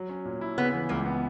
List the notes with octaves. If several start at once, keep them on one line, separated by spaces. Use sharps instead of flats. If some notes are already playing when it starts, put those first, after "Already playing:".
Already playing: F#3
C#4
A#2
E4
C#3 B3
E3
C#2 A#3
B3